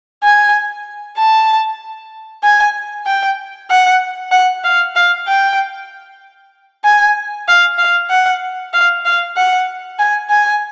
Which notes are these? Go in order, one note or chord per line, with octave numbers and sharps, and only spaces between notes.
G#5
A5
G#5
G5
F#5
F#5
F5
F5
G5
G#5
F5
F5
F#5
F5
F5
F#5
G#5
G#5